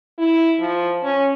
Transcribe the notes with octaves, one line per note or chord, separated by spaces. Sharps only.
E4
F3
C#4